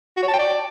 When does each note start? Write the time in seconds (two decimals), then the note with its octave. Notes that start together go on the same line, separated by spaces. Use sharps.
0.17 F#4
0.22 C#5
0.28 A5
0.33 G5
0.39 D5